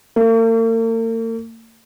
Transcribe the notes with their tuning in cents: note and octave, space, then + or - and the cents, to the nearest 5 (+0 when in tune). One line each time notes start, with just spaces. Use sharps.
A#3 -45